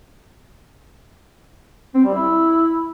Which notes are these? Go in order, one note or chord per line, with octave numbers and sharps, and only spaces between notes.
C4
G3
E4